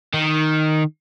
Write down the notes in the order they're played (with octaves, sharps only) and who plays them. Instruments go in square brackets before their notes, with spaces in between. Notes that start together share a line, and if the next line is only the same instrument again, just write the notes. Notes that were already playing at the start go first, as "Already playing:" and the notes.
[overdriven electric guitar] D#3